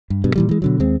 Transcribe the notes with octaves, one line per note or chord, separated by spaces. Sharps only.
G2
G2 B2
A#2 E3 G3
E3 G#3
B2 D3 F#3
D#2 G#3 C4